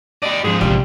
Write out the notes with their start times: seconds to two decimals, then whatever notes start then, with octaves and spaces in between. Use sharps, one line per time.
0.23 G4 D5 D#5
0.44 G#2 F3 G#4
0.61 A#1 C3 G3